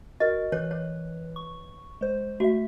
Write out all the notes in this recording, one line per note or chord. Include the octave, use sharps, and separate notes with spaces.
F#4 A#4 D#5
E3 B4 C#5
C#5
C#6
G#3 C5
A3 F#4 E5